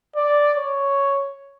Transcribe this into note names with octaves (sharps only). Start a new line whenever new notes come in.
D5
C#5